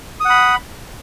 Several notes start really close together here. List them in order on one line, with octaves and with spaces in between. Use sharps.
D#6 F#5 B5